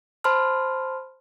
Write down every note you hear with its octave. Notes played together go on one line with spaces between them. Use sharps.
C5 A5 B5 C6 F6